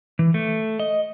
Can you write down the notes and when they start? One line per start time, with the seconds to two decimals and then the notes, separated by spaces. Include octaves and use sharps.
0.19 E3
0.34 A3
0.80 D#5